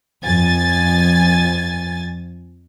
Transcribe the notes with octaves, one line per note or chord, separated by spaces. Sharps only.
F2 G#5 A6